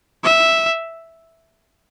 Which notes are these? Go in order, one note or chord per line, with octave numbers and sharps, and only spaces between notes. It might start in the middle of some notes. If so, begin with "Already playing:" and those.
E5